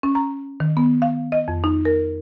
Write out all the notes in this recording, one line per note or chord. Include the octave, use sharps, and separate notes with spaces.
C#4
A#5
D#3
B3
F5
D#5
F2
D#4
A#4